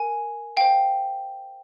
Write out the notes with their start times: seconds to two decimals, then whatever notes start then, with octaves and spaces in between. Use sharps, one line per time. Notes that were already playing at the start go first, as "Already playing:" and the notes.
Already playing: A#4 G#5
0.57 C5 F5 G5